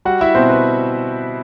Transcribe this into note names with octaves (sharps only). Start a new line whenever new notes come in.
G3 F#4 F#5
E4 E5
B2 C4 C5
B4